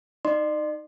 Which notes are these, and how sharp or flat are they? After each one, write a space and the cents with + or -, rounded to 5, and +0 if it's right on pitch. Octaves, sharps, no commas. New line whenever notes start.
D#4 -5 D5 +45 C6 +0